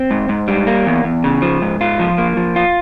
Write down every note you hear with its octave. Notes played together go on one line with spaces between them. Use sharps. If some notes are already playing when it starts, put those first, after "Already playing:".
Already playing: C4
G#2
G#2
G3
A#3
E2
E2
C#3
F3
G#2
F4
F3
A#3
F3
F4